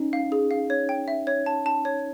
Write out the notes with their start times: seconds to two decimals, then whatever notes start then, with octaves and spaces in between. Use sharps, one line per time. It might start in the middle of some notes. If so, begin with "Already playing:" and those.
Already playing: C#4 D#4
0.13 F5
0.32 G#4
0.51 F5
0.70 C#5
0.89 G5
1.08 E5
1.27 C#5
1.46 A5
1.66 A5
1.85 C#5